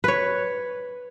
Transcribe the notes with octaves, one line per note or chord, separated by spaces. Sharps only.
B4 C#5